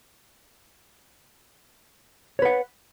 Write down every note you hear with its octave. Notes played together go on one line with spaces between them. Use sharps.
B4 C#5 F#5